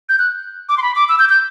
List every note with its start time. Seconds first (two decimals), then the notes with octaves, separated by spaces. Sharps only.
0.09 G6
0.19 F#6
0.69 D6
0.77 C6
0.82 B5
0.96 D6
1.09 E6
1.19 G6
1.29 G6